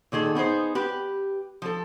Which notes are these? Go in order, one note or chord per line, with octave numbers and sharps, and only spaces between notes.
A#2 D#3 G#4 A4
B3 D#4 G#4 C5
G4 B4
F3 A4